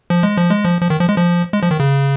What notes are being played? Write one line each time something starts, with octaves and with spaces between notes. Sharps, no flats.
F3
G#3
F3
G#3
F3
F3
D#3
F3
G#3
F3
G#3
F3
D#3
C#3